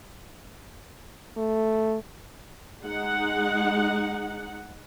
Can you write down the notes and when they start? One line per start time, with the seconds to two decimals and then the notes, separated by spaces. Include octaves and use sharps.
1.37 A3
2.82 G#3 D#4 F#5